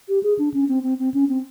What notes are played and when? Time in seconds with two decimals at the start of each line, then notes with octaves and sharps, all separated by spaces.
0.09 G4
0.23 G#4
0.39 D4
0.54 C#4
0.69 C4
0.84 C4
0.99 C4
1.14 C#4
1.29 C4